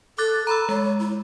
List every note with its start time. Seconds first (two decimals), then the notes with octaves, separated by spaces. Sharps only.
0.18 A4 D6 F#6 A6
0.47 A4 A#5 B5 E6
0.69 G#3 C#5
1.00 E4